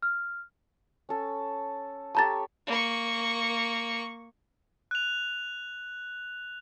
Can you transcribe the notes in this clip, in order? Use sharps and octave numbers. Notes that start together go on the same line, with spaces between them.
F6
C#4 A4
G4 A4 C#5 A5 A#5 A6
A#3 C#6
F#6 F7